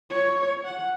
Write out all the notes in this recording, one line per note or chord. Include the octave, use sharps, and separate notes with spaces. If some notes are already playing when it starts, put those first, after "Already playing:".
C#5
F#5